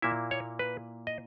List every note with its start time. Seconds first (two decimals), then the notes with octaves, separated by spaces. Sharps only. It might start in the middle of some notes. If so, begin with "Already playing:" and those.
0.02 A#2 A#3 E4 E5
0.31 C#5
0.59 B4
1.07 D#5